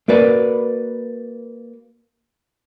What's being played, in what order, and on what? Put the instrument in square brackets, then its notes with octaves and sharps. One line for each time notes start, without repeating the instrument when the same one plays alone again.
[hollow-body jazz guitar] A#3 F#4 B4 D5